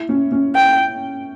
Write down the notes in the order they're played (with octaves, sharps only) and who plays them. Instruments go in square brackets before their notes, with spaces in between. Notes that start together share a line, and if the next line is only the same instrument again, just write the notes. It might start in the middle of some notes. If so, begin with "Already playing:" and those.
Already playing: [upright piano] E4
C#4
C#4
[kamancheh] G5